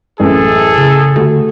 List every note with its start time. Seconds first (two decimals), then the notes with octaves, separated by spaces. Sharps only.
0.20 A1 F#2 G#4 A4
0.78 C#3
1.16 D3 A3 F#4 G4